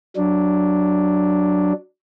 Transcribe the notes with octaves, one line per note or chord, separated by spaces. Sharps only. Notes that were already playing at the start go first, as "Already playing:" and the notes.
F#3 D4